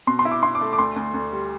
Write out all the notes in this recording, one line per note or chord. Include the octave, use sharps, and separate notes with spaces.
B2 C6
C6
E4
D6
E4 C6
D6
A3
D6
D2 C6
D2
D2
G3